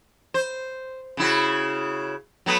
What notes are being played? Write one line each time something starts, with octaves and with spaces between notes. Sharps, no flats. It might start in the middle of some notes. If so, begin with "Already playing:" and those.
C5
C#3 E4 F#4
F#3 A3 B3